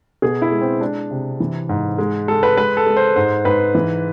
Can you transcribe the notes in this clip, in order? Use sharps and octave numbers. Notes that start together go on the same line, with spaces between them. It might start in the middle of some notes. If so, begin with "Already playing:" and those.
B2 G#4
E4
G#3
C4
G#3 D4
C3
E3
G#2
G#3
G#3 A4
B4
G#3 B4
A4
G#3
C5
G#2 C5
G#2 B4
E3